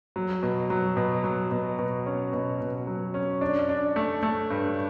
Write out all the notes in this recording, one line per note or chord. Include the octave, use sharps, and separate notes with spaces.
F#3
B2
F#3
B2
F#3
B2
B2
C#4
B2
B2
F#3
C#4
D4
D4
A3
A3
G2